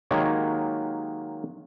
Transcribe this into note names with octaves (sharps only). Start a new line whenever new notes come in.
D#3 F#3 G#3 A#3 G4 C#5